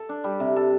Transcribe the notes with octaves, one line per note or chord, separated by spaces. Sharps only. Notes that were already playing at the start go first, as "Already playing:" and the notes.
Already playing: A4
D4
G3
C3
A4